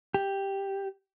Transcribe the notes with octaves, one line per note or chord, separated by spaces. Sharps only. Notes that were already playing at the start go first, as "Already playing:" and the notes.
G4